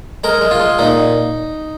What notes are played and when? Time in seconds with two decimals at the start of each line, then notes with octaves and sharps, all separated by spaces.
0.24 G#3 A#4
0.41 G#3
0.51 F4
0.60 G#3
0.79 A#2 D#4